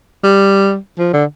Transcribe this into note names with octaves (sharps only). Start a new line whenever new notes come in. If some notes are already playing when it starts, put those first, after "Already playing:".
G3
F3
D3